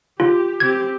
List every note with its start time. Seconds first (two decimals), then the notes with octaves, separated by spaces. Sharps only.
0.20 F4 G4
0.60 C4 G4 G#6